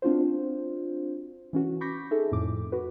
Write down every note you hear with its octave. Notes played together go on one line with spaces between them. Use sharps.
C4 D4 F4 F#4 C5
E3 C#4 F#4
B5 C#6 D6 G6 A#6 B6
D#4 G#4 A4 E5
F2 A2 D6
F#4 B4